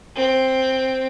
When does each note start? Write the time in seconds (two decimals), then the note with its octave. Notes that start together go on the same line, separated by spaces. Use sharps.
0.16 C4